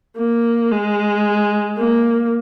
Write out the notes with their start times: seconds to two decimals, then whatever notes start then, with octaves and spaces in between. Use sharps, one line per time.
0.17 A#3
0.71 G#3
1.78 A#3